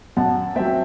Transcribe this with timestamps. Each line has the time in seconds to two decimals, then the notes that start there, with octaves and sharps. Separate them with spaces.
0.17 F#2 F#5 A5
0.56 F#3 C4 E5 G5